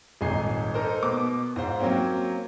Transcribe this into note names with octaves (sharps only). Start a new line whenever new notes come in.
D#1 G#1 D#4 G#5 C7
D#4 A4 A#4 C5
B2 B3 D6
G#2 F4 C5
F#3 A#3 C4 C#4